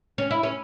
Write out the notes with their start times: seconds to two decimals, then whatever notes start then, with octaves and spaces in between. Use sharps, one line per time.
0.18 C#4
0.31 E4
0.43 C#4